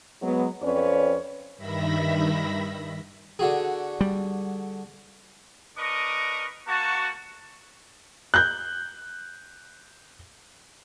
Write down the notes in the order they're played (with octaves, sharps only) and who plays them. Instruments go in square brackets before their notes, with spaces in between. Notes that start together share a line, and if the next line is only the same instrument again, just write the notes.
[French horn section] F#3 G#3 B3
F2 C4 C#4 B4 C#5 D5
[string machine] G2 D#3 E5 B5 A#6
[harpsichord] D3 F#4 G#4
[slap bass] G3
[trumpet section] D4 A#4 B4 D#5 C#6 D6
A#3 F#4 A5
[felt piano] F#6 G6